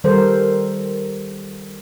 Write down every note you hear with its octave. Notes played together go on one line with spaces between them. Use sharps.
D#3 G3 A4 A#4 C5